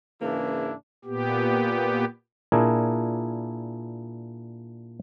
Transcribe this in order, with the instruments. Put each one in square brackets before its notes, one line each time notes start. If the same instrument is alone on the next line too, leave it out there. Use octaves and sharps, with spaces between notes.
[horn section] G#2 C#3 E3 A#3 D4 E4
[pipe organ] A#2 B3 G4
[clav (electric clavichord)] A#2 D4 E4 G#4 A#4